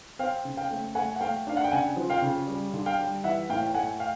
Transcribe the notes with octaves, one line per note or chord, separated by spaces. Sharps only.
C4 F5 G5
C#3
F5 G5
A3
A3 F#5 G#5
F#5
A3 F5 G5
D4 F5
F#5
G5
C#3 F#5 G#5
F3
F5 G5
C#3
G3
D3
F5 G5
G3
E3 E5 F#5
A2 F5 G5
G5
A3 F#5 G#5
F5 G5